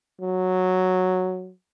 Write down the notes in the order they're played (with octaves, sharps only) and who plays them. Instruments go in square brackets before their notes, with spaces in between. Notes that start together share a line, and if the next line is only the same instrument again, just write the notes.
[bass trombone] F#3